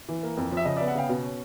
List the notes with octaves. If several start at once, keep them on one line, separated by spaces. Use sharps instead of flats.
E3
A#3
F2
F3
E5
C#3 D#5
B3 D5 E5
E5 F#5
C#3 F5 G5
B2
C#4